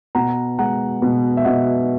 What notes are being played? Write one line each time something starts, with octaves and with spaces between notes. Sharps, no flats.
B2 F#5 A#5
G#3 F#5 A#5
B2
E5
B2 D#5 F#5